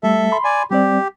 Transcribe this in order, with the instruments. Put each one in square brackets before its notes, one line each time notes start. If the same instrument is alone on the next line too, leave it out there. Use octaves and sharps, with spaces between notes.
[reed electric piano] G3 A3 [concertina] A4 E5
[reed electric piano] B5 C6
[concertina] D5 G#5
[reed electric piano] G3 C4 D5 [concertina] G4